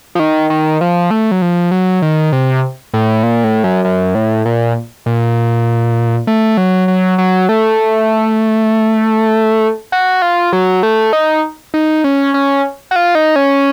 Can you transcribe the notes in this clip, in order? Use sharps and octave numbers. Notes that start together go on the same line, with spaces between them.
F3
D#3
D#3
F3
A3
F#3
F3
F#3
D#3
C3
A2
A#2
A2
F#2
F#2
A2
A#2
A#2
A3
F#3
F#3
F#3
A3
F#4
F4
F#3
A3
D#4
D#4
C#4
C#4
F#4
F4
D#4
C#4